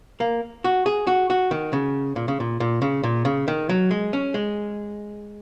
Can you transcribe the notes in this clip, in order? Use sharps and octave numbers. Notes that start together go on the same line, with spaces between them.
A#3
F#4
G#4
F#4
F#4
D#3
C#3
A#2
C#3
A#2
A#2
C#3
A#2
C#3
D#3
F#3
G#3
C#4
G#3